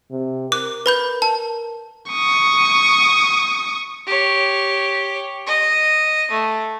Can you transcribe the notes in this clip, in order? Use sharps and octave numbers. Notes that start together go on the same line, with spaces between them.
C3
A#4 D6 F#6
B4 B5 G6
A5
C#6 D#6
G4 C#5
D#5
A3